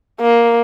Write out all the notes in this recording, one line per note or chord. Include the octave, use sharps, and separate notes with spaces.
A#3